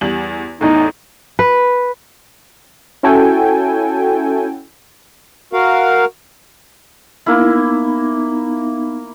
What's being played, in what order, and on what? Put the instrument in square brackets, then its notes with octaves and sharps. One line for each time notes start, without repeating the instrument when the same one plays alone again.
[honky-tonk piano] E2 G3 F#7
[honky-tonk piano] A1 E2 A2 [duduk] D#4
[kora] B4
[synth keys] C#4 E4 F#4 A4 G5 G#5
[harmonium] F#4 A#4 F5
[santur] A#3 E4 [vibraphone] B3 D#4